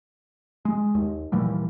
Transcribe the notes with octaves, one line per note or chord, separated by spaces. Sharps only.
G#3
D#2
A#2 E3 F3 G3